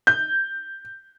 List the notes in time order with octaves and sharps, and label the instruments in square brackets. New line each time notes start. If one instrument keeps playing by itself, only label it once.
[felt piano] G6